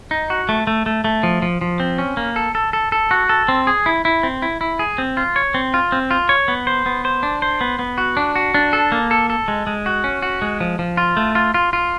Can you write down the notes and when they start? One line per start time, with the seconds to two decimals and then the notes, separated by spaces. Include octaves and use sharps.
0.11 D#4
0.30 F#4
0.49 A3
0.67 A3
0.86 A3
1.04 A3
1.23 F3
1.42 F3
1.61 F3
1.80 C4
1.98 C#4
2.17 A#3
2.36 A4
2.55 A4
2.73 A4
2.92 A4
3.11 F#4
3.29 A4
3.48 C4
3.67 G#4
3.86 E4
4.05 E4
4.23 C4
4.42 E4
4.61 E4
4.79 G#4
4.98 C4
5.17 F4
5.36 C#5
5.54 C4
5.74 F4
5.92 C4
6.11 F4
6.29 C#5
6.48 B3
6.67 C5
6.86 B3
7.05 C5
7.23 D4
7.42 C5
7.61 B3
7.79 B3
7.98 F#4
8.17 D4
8.36 F#4
8.54 D4
8.73 A4
8.92 A#3
9.11 A4
9.30 A4
9.48 G#3
9.67 G#3
9.86 F#4
10.04 C#4
10.22 F#4
10.42 G#3
10.60 F3
10.79 F3
10.97 F4
11.17 A3
11.35 F4
11.54 F4
11.73 F4